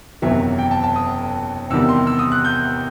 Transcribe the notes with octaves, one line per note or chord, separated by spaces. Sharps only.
F#1 E2 C3 D#3 F#3 E5
G5
A5
A5
D#6
E2 C3 D#3 G3 E6
C6
E6
D#6
F#6
G6